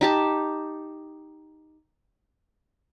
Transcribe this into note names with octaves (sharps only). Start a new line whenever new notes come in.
D#4 G4 A5